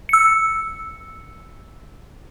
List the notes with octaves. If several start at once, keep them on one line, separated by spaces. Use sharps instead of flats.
E6 C#7